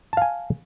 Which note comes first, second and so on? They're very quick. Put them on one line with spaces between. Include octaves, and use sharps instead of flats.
A5 F5 G#5